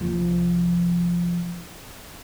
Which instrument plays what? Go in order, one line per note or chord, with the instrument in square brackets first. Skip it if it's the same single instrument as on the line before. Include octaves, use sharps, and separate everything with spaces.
[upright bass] C2 F3